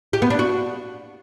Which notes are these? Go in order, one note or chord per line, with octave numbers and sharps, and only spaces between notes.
G4
B3
D4
F#4